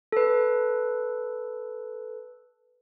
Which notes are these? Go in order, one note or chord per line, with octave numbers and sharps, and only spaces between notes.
A4 B4